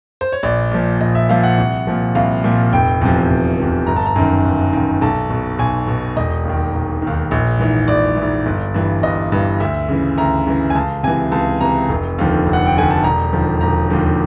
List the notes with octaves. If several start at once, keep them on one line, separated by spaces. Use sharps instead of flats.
C5
C#5
A#1 D5
A#2 F3
A#1 D#5
E5
A#2 F3 F5
F#5
C2
A#2 F3
C2 F5
A#2 F3
F1 G5
E2 C3 F3
F1
E2 C3 F3
G1 A#5
A5
A#5
F#2 D#3
G1
F#2 D#3
B1 A5
B2
B1 G#5
B2
E1 D#5
D#2 D#3
E1
D#2 D#3
A#1
G#2 E3
A#1 D5
G#2 E3
G1
G2 E3
G1 D#5
G2 E3
D2 E5
C#3 E3
D2 A#5
C#3 E3
G#5
C#2 A5
C3 E3 G#5
C#2 A5
C3 E3 A#5
F1
D#2 D3 F3
F1
F#5
G5
D#2 D3 F3 G#5
A5
E1 A#5
D#2 D3 F3
E1 A#5
D#2 D3 F3